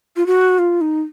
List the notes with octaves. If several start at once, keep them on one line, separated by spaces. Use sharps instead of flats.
F4
F#4
F4
D#4